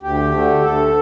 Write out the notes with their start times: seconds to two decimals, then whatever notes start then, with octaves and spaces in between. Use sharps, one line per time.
0.03 D2 G4
0.32 D3 A3
0.61 D2 A4